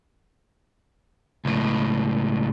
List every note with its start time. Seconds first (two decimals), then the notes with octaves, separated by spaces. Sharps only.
1.45 C#2 A2